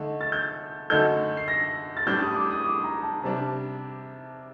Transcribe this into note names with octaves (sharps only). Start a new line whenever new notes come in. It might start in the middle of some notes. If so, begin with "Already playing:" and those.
Already playing: D3 A3 D#4
A6
G6
F#2 D3 A3 D#4 A4 G6
C7
A#6
A6
A2 G3 D4 G6
D#6
D6
D#6
D6
A#5
A5
C3 G3 D4 A5